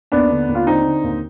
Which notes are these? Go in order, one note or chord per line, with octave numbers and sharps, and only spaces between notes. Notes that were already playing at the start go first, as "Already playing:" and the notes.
D#2 B3 D4
D3
D#2
F4
D3 C4 D#4
D3
D#2